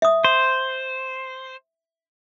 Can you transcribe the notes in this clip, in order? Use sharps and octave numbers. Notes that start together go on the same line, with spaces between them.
E5 D#6
C5